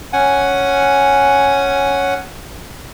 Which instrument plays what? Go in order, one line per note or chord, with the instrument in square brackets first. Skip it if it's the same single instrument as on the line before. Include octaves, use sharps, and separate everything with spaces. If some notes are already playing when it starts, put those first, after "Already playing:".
[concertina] C#4 F#5 G#5